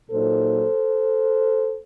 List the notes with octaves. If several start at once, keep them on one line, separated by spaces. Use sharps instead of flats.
A#2 F#3 A#3 D#4 A4 C5